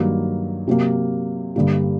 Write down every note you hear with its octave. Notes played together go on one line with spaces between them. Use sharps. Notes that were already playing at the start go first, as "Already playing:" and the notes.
Already playing: G2 D#3 F#3 A#3
C3 F#3 A#3
G2 D3 G3 A#3